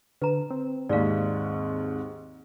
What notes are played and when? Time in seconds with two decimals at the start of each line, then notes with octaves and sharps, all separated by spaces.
0.22 D3 B4 A#5
0.50 C4
0.89 D#2 G#2 D5 F5